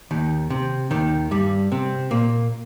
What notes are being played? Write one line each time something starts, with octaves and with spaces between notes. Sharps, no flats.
D#2 D#3
C3
D#2 D#3
G2 G3
C3 C4
A#2 A#3